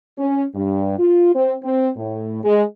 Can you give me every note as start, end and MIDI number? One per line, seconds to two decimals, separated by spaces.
0.18 0.44 61
0.55 0.96 43
0.98 1.33 65
1.34 1.54 60
1.63 1.89 60
1.96 2.39 45
2.43 2.62 56